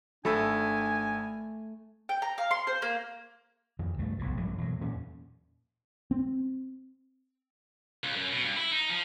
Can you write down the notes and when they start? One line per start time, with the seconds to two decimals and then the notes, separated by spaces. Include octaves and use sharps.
0.25 G#1 A3 D4 G#5 B5 E6
2.09 G5
2.22 A#5
2.38 F5
2.51 C6
2.67 C5
2.82 A#3
3.79 F2 D#3
3.98 C#2 G2 A3
4.19 F1 B1 A2
4.37 A#1 G2 F3 G#3
4.58 E2 B2 F#3
4.81 E2 A#2 E3 C#4
6.11 C4
8.04 C#2
8.16 F#2
8.32 B2
8.44 G2
8.57 E4
8.72 D#4
8.90 F3